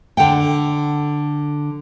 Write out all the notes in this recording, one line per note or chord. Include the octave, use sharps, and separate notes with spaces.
D3 A4 F#5 G5